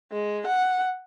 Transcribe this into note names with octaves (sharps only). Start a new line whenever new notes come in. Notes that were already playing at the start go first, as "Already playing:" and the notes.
G#3
F#5